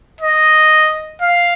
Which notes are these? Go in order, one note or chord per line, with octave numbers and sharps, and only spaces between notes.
D#5
F5